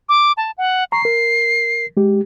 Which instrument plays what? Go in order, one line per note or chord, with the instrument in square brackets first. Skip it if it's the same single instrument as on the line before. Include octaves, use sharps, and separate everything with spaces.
[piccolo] D6
A5
F#5
[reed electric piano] A#5 C#6 [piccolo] C7
[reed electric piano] A#4
G#3 G4